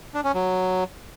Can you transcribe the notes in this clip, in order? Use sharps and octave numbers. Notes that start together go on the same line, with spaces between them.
D4
C#4
F#3